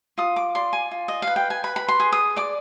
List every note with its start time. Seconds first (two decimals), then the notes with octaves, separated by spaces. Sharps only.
0.18 F4 D#6
0.36 D6
0.55 D5 C6
0.73 G#5
0.91 F4
1.08 D#5
1.22 B4 F5
1.36 G5
1.50 G#5
1.64 B4 B5
1.76 B5
1.88 C6
2.00 G#4
2.12 D#6
2.36 D5 D6